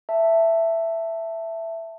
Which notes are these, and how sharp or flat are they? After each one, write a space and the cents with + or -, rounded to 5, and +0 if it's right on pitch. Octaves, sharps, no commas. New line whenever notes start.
E5 +5 A5 +10